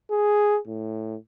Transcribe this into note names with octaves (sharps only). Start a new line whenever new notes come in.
G#4
A2